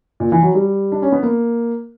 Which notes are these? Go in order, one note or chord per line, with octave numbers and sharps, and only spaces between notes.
A#2
E3
F#3
G3
D4
C#4
B3
A#3